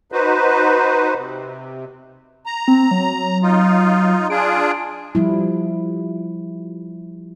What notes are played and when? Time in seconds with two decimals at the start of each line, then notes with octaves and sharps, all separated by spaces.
0.12 D#4 F#4 B4 C5
1.15 C3
2.46 A#5
2.68 C4
2.91 F#3
3.43 D#4 F4
4.30 D4 F4 G#4 D7
5.15 F3 G3 E4